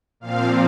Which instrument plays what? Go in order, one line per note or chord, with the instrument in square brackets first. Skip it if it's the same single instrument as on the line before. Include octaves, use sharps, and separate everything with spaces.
[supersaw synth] A#2 F3 C4 F5